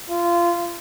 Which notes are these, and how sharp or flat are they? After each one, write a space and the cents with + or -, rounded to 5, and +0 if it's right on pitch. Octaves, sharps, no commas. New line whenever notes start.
F4 -20